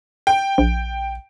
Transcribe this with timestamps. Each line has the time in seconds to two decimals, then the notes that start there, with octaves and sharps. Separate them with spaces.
0.27 G5
0.58 A#1